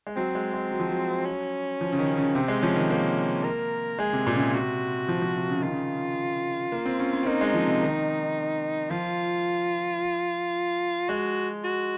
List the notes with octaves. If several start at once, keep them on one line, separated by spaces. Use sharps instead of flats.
G#3
F#3 C4
G#3
G#3
F#3
F3
F#3
C#4
F3
C#3
D#3
C#3
C3 C4
G#3
F3 C#4
D#3
A#3 C#4
A#4
G#3 G#4
C3
A#2
C#3
C3
F#4
F3
F3
C3
C#3
D#3 F4
C#3
A#3
C4
C#4
C#4
C4
A#3 D#4
G#3
F3
C3
D#3
F3 F4
G#3 F#4
F#4